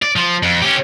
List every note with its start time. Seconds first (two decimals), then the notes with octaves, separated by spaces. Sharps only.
0.02 D5
0.16 F3
0.43 F2
0.62 C#4 G4